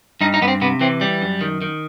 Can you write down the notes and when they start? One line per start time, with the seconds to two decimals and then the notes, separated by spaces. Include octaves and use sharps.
0.21 G2 D#4
0.34 D#4
0.42 G2 B3
0.48 C4
0.61 C3 B3
0.81 E3 C4
1.01 G3
1.22 F#2
1.41 D#3
1.62 D#3